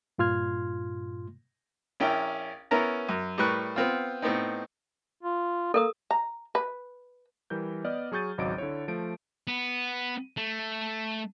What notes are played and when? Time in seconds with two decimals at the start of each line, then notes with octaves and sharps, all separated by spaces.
0.18 G2 A#2 F4 C6 F6 G#6
2.00 A#1 C#4 E4 A#4 G5
2.71 B3 C#4 E4 A#4 A#5
3.09 F#2
3.38 A2 G3 A#4 B4 C#6 F#6
3.76 B3 C4 F4
4.22 A2 B3 C4 D#4
5.23 F4
5.74 A#3 A4 A#4 D#6
6.11 A#5
6.55 B4
7.50 E3 G3 A#4 G6
7.84 B3 D5 D#5 F6
8.12 F#3 G#4 C#6 G6 A6 D#7
8.38 G#1 C#2 F#3 D#5 D6 D7
8.58 D3 E4 C#5
8.88 F3 A3 D7
9.47 B3
10.37 A3